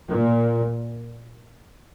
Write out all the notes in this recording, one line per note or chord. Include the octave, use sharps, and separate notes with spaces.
A#2